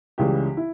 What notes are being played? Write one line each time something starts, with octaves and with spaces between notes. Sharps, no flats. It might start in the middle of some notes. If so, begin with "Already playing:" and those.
C#2 C#3 E3 G3 G4
E4